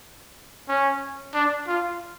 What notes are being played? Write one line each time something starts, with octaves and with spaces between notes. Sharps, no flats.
C#4
D4
F4